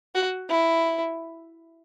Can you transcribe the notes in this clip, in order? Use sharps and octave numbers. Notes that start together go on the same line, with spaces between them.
F#4
E4